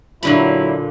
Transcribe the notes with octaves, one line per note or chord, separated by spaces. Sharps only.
A#2 D3 F#3 E4 B5